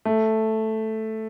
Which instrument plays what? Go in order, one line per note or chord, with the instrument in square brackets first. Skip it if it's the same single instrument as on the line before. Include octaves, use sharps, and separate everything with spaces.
[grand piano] A3